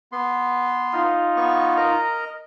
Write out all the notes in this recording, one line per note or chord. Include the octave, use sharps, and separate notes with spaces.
B3 C6
D#4 F4
B3 C#6
A#4 D#5 A#5